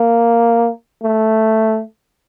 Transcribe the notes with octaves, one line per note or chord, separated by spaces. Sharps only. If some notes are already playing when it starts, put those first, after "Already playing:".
Already playing: A#3
A3